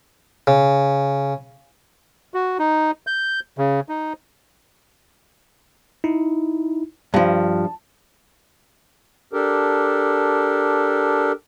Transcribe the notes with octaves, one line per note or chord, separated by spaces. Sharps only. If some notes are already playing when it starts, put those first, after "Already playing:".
C#3
F#4
D#4
G6
C#3
D#4
D#4 E4
G2 F3 A5
D4 G4 A4 A#4